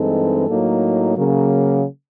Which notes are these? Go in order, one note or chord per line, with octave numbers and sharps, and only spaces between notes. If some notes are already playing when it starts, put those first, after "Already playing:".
Already playing: G2 E3 G#3 C4 D#4 A4
A2 F#3 A#3 D#4
C#3 F#3 A#3